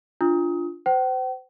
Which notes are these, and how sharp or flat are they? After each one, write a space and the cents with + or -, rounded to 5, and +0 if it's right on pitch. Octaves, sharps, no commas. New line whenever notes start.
D4 +0 F4 -5 D#6 +25
C5 -30 G5 -45